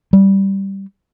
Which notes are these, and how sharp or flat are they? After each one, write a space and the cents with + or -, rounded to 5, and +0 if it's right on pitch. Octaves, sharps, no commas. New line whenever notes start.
G3 -5